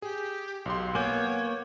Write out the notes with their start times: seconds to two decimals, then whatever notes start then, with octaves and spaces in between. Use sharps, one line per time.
0.02 G4 G#4
0.66 B1 G4 C6
0.95 A#3 B3 C#5 G#5 D6 G6